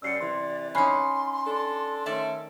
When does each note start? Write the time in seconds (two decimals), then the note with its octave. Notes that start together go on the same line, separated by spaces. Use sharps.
0.02 F#2 G3 D5 E6 C7 C#7
0.21 C3 E3 C6
0.75 C#4 D#4 B5 C6 F#6 C7
1.45 D4 A4
2.06 D#3 A3 C#4 D5 E5 A5